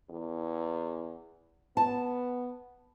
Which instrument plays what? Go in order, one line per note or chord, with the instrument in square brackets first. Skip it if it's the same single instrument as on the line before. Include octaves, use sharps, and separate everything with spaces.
[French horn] E2
[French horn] B3 [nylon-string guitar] A5